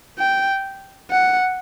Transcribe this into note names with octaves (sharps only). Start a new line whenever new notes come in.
G5
F#5